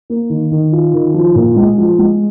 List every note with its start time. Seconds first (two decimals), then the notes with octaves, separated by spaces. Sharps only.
0.10 A#3
0.30 D#3
0.51 D#3
0.72 F4
0.94 D#3
1.14 F3
1.35 A#2
1.56 G#3
1.78 F3
1.99 G#3